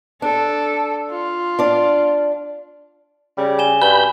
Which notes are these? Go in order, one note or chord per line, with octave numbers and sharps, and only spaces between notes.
D4 A4
F4
D4 D5
C#3 G3
G#5 E7 G7
G2 F#4 B5 G6 G7